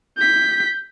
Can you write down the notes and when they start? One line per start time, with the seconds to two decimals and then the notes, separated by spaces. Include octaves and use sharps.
0.18 G6 B6